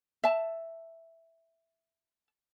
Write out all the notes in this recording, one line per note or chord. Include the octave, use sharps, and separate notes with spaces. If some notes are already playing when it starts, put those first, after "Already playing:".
E5 A5